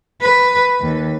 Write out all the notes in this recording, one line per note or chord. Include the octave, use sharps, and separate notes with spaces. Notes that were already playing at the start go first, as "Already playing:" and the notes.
B4
D#2